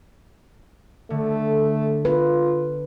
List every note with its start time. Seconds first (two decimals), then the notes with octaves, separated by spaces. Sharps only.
1.10 D3 A3
2.05 F4 B4